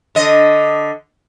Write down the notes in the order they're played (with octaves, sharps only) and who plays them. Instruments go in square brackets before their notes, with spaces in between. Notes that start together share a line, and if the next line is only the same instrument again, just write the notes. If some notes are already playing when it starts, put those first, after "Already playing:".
[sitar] D3 D#5